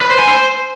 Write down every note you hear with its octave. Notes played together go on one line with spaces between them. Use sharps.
B4
C5
G#5
C5